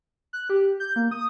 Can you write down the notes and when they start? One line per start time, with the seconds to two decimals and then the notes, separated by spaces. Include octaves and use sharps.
0.33 F#6
0.50 G4
0.80 G6
0.96 A#3
1.11 D#6